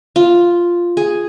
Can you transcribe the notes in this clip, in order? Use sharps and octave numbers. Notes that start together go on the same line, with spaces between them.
F4
G#4